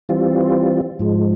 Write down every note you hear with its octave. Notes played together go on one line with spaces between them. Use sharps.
E3 G3 C4 F4
G#2 F3 G#3